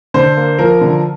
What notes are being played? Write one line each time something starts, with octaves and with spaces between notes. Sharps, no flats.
D3 C5
A#3
F3 A#4
D3